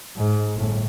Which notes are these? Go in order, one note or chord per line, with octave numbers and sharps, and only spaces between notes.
G#2
G1 A2